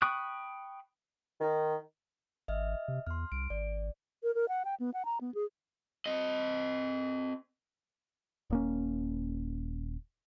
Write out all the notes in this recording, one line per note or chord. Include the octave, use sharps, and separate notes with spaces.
G5 B5 C#6 D#6 F#6
D#3
G#1 D#5 E5 F6
C3
E2 C6 F6
C2 D7
G#1 D5
A#4
A#4
F#5
G5
B3
F#5
A#5
B3
G#4
C4 D#5
D#1 A#3 C#4